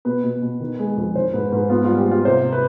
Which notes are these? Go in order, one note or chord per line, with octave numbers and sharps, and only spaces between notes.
B2 B4
B2
B2
D#3
G#3
F2
D#3 C5
G#2 B4
G#2 B4
B3 F4
G3 F4
G4
B3 F4
C3 C5
C3
B4